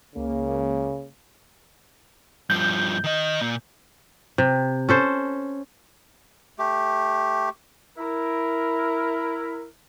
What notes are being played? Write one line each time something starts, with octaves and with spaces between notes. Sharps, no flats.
C#2 C#3 A#3
G2 F3 G6
D#3 D#5
A#2
C3
C#4 A4 C5
A3 G4
E4 A#4